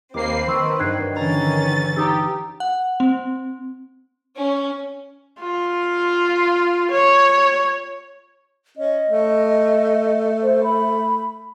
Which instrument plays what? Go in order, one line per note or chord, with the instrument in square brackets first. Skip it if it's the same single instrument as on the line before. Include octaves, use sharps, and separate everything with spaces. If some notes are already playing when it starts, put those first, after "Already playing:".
[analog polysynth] D#2 A#3 C7 [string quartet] C4 B4 [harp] D6
[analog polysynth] D#3 [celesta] C6 C#6 E6
[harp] G2 F#3 [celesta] F#6 G#6 C7
[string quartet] D3 C#4 A6 [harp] E3 A#5
[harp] D#4 [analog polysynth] G4 [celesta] A#5 D#6 E6
[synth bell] F#5
C4
[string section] C#4
[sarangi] F4
C#5
[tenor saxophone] C#4 [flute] D#5
[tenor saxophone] A3
[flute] C5
B5